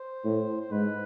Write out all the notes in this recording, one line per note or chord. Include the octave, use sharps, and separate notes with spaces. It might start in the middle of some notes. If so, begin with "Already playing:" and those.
Already playing: C5
A2
C5
G#2 B4